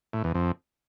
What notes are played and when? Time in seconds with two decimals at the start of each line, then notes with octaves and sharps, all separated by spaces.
0.13 A2
0.24 E2
0.34 F2